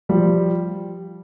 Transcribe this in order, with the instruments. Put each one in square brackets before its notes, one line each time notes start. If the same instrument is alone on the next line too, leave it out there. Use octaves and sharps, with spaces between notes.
[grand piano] F3 G3